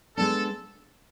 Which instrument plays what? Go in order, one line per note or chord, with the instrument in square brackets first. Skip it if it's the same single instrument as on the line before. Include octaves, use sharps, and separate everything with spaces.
[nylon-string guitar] G#3 B3 D4 [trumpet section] A4